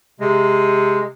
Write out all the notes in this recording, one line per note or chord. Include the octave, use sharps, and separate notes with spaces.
C3 G#3